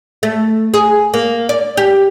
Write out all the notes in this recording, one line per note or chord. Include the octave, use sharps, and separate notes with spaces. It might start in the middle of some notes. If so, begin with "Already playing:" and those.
A3
G#4
A#3
D5
G4